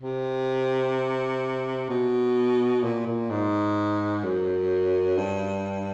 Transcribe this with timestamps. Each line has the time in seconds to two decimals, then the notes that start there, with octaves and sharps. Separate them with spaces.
0.01 C3
1.89 B2
2.83 A#2
3.07 A#2
3.31 G#2
4.24 F#2
5.18 G2